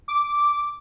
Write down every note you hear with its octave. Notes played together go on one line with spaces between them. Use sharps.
D6